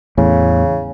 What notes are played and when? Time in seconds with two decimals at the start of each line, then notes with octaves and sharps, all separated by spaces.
0.18 E2 A2 C#3